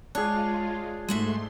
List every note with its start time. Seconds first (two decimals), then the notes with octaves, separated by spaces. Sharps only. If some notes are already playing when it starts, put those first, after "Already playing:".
0.15 G#3 D4 F4 G#4 C#5
1.08 G#2 G#3 A3 F#4 E5 C6